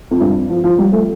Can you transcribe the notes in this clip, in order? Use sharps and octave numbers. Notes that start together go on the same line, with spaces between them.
F2
G2
F3
F3
G3
A3